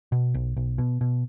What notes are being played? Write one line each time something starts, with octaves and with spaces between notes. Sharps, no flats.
B2
B1
B1
B2
B2